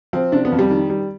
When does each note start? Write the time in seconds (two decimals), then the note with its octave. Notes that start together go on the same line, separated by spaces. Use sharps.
0.13 F3 C4
0.32 C3 D4
0.45 B3
0.52 F2
0.59 G3
0.70 D#3
0.90 G3